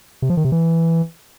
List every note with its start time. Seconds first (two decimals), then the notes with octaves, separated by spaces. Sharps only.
0.22 C3
0.30 F3
0.37 D#3
0.45 C3
0.52 E3